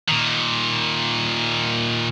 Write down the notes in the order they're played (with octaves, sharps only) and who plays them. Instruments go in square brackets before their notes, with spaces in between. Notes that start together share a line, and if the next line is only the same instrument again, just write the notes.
[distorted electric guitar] A#2 D#3